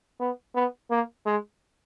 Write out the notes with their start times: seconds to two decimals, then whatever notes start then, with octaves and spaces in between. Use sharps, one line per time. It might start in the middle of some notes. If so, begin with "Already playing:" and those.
0.20 B3
0.55 B3
0.90 A#3
1.26 G#3